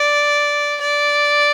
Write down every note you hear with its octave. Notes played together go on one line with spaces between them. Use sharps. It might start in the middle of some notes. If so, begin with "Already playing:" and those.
Already playing: D5
D5